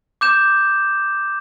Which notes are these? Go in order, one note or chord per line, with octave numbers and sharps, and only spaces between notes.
D6 G6 E7